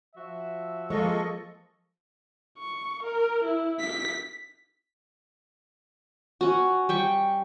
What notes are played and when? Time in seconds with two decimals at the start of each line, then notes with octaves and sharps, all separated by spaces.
0.15 F3 F#4 E5
0.90 F3 G#3 A#3 F4 A4 D#5 C#6
2.58 C#6
3.03 A#4
3.44 E4
3.80 B6
6.41 C#4 F#4
6.89 G3 G5 C#6